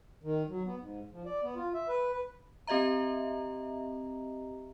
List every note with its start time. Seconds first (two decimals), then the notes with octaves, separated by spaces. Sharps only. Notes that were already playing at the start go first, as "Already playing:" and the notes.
0.23 D#3
0.49 F#3
0.66 B3
0.80 G#2
1.11 F3
1.25 D5
1.43 B3
1.56 F4
1.74 E5
1.88 B4
2.13 B4
2.67 C4 G4 D#5 E5 A#5